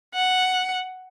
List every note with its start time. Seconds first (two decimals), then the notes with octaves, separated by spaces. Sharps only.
0.14 F#5